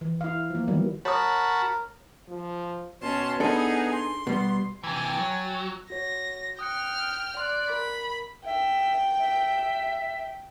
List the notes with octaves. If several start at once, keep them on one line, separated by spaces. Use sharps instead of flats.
E3
E4 F5
F3 A#3
D#3 E3 F#3 G3 B3
F#4 A#4 C#5 E5 A5 B5 D#6
F3
B2 C#4 A5 C6
B3 D4 D#4 G#4 A4
C6
B2 G3 B3
C3 E3 G5 G#5 A6
F#3
F#4 C#5 A#6
G5 D#6 F6 F#6 C#7
D5 C6 F#6
A#4 B5
E5 G5
E5